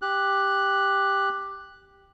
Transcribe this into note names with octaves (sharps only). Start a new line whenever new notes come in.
G4 F#6